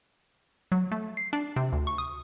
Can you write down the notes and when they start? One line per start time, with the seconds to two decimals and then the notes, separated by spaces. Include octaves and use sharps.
0.72 F#3
0.92 A3
1.17 C7
1.33 D4
1.56 C3
1.73 D2
1.87 C#6
1.98 D#6